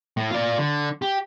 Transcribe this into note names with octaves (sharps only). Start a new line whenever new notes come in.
A2
F4 D5
D3
G4